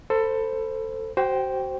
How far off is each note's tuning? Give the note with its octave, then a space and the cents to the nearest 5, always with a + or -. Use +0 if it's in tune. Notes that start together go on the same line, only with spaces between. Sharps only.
A4 +20 C5 +0 B5 +0
F#4 +35 C5 +0 G5 +0